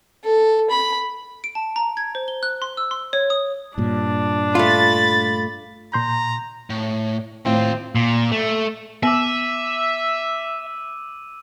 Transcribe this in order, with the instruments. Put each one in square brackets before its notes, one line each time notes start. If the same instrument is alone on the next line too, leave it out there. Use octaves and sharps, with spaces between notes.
[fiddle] A4
B5
[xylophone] D7
A5
A#5
G#6
C5
G7
F#6
C6
E6
C6
C#5
D#6
[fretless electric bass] G2 A#2 [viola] D4
[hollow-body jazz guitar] A3 F4 [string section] B5 A6
[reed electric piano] A#2 C6 G6 [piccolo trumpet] A#5
[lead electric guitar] A2
[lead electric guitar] D#2 F4 [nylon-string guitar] A2 [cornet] C4
[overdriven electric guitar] A#2
A3
[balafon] B3 [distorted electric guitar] E5 [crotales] D6 E6 D#7